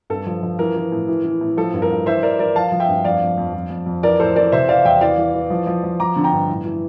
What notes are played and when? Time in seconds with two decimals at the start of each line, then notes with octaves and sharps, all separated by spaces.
0.10 G2 A4
0.26 F3
0.43 F3
0.59 E3 A#4
0.76 E3
0.92 A2
1.08 E3
1.24 E3
1.41 A2
1.57 F3 A4
1.74 G2
1.82 A#4
1.90 G2
2.06 E3 C5 E5
2.23 E3 A#4 D5
2.39 E3 A#4 D5
2.55 F3 F5 A5
2.72 F3
2.80 E5 G5
2.89 G2
3.04 F2 D5 F5
3.21 F2
3.38 F2
3.54 F2
3.70 F2
3.86 F2
4.03 E3 A#4 D5
4.20 A2 A4 C5
4.36 E3 A#4 D5
4.52 C3 C5 E5
4.69 E3 D5 F5
4.85 E2 E5 G5
5.01 E3 D5 F5
5.17 E3
5.34 E3
5.50 F3
5.67 F3
5.84 F3
6.00 F3 A#5 D6
6.16 D3
6.24 G5 A#5
6.33 G2
6.49 A2
6.66 E3